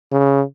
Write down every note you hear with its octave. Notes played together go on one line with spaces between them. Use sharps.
C#3